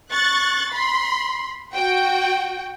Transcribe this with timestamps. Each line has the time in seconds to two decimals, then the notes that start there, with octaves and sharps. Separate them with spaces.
0.11 C#6 F#6 A6
0.73 B5 C6
1.74 F#4 G5